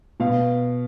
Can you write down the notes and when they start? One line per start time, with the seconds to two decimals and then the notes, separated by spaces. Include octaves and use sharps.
0.20 B2 F5